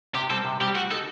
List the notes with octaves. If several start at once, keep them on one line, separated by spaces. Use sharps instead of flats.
C3 G4
G3 C4 A4
C3
G3 C4 G4
A3 F#4
D#4 F#4 A4